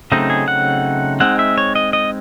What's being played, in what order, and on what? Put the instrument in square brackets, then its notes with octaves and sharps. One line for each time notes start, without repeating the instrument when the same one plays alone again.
[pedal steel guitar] C#3 F#3 A3 C4 D#4 D#5
G#4
F#5
G#3 C4 D#4 F#5
E5
C#5
D#5
D#5